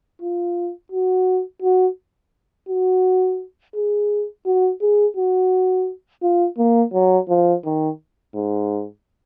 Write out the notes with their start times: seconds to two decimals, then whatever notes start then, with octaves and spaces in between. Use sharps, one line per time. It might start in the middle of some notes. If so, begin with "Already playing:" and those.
0.22 F4
0.92 F#4
1.62 F#4
2.69 F#4
3.75 G#4
4.46 F#4
4.81 G#4
5.17 F#4
6.23 F4
6.58 A#3
6.94 F#3
7.29 F3
7.65 D#3
8.35 G#2